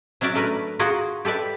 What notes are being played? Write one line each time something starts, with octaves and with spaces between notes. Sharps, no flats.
F#3 C#4 F#4 D5 E5
A3 D4 A#4 B4
F4 F#4 G#4 A#4 F#5
G4 A4 B4 D5 E5